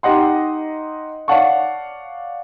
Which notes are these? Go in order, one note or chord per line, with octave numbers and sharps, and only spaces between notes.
D#4 G4 D#5 F#5 C6
C#5 D5 F5 F#5 A5 C#6